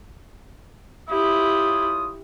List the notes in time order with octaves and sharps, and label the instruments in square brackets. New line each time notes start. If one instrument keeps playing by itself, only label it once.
[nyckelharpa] E4 G4 [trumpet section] F4 C#5 D#6